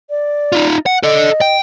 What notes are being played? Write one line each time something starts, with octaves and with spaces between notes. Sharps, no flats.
D5
D#4 F4
F#5
A4 D5 D#5
G5